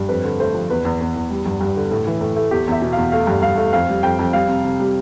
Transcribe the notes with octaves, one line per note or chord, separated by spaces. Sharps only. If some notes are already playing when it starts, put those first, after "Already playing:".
Already playing: G2
F2 B4
D3
A3 C5
F3
E2 B4
E2
E2
E2
G3
G2
G2
D3
A2
E3
A2
A3
E2 G4
E2 E5
B2
E2 F5
A3 F5
G2
G2 F5
A3
F2 F5
G3
F2 G5
F2
G3 F5
C3
C3
G3